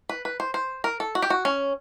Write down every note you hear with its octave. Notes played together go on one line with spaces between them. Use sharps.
B4
B4
C5
C5
A#4
A4
F#4
G4
F#4
C#4